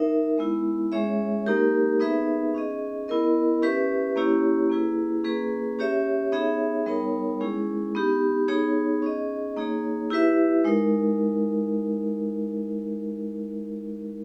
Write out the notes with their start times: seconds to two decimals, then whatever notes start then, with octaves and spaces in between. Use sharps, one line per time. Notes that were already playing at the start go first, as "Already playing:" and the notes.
Already playing: D#4 A#4 E5
0.38 G#3 B3 E4
0.92 G#3 C#4 G#4 C#5 E5
1.46 A#3 D#4 G4 A#4
2.00 B3 D#4 G#4 B4 E5
2.55 C#4 G#4 D#5
3.08 B3 E4 A#4 D#5
3.62 C#4 G4 B4 E5
4.16 A#3 C#4 E4 G4 C#5
4.70 A#3 E4 G#4 B4
5.24 A#3 C#4 G#4 B4
5.79 C#4 G4 C#5 E5
6.32 B3 D#4 G#4 C#5 E5
6.86 G3 B3 D#4 A#4 C#5
7.40 G#3 C#4 E4 G#4
7.95 B3 D#4 G4
8.48 B3 D#4 G#4 C#5
9.02 C#4 G#4 D#5
9.57 A#3 D#4 G#4 C#5
10.10 E4 G4 B4 E5
10.65 G#3 D#4 A#4